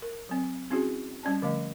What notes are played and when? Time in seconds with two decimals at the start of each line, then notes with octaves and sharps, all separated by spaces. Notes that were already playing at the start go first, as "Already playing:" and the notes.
0.02 A#4
0.29 F#3 C4
0.70 C4 C#4 E4 F#4 G#4
1.23 G3 C#4 D5 A5
1.42 D3 F3 A3 D#5